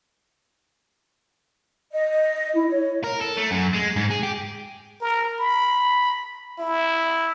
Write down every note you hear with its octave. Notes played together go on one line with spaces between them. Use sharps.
D#5
E4
C#5
A#4
A4
A3
F#2
G#3
G#2
G#4
G4
A#4
B5
E4